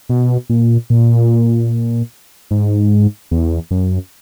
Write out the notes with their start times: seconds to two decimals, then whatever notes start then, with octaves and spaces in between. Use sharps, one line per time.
0.09 B2
0.50 A#2
0.90 A#2
2.51 G#2
3.31 E2
3.71 F#2